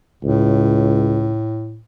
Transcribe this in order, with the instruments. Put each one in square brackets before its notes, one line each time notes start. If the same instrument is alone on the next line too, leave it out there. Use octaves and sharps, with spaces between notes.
[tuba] C#2 [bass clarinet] A2